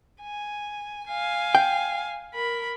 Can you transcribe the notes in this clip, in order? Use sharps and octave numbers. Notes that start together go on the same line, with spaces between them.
G#5
F5 G#5
G5
A#4 B5